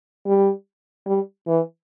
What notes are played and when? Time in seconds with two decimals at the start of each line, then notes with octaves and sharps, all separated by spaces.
0.26 G3
1.07 G3
1.48 E3